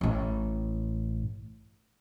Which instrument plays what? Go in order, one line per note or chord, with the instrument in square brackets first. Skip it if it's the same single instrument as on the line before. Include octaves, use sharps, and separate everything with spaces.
[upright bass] A1 A2